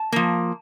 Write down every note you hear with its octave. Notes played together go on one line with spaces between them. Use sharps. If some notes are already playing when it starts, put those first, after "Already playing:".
Already playing: A5
F3 A#3